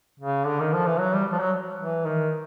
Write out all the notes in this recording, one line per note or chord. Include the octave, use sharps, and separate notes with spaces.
C#3
D3
D#3
F3
E3
F#3
G3
F3
F#3
E3
D#3